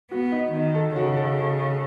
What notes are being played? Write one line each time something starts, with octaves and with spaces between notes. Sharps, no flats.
B3 F#4
D#4
D#3 D#4
A4
C#3 F#4
A4